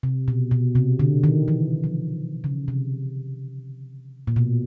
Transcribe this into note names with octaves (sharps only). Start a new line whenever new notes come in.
C3
B2
B2
C3
D3
D#3
E3
F3
C#3
C3
A#2
B2